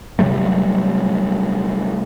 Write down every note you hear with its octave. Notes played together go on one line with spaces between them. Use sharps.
C3 F#3 G3 A3